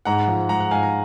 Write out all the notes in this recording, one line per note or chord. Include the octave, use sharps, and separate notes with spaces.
G#2 F#5 A#5
F3
G#3 F#5 A#5
F#5
G#2 F5 G#5
A#5